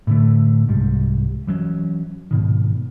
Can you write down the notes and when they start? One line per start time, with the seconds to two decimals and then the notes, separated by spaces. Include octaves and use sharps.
0.07 A2 D3 A3
0.68 C2 G#2 G3
1.47 E3 F#3 A3 C#4
2.31 G#2 B2 D#3